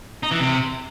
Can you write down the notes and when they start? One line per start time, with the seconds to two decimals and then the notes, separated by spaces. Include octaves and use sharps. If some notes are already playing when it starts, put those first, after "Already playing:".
0.23 D#4
0.31 E3
0.40 C3